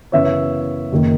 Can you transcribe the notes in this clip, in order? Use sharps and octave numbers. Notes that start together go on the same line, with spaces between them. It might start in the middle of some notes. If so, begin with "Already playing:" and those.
F#2 C#3 E3 B3 C#5 E5
F#1 D#3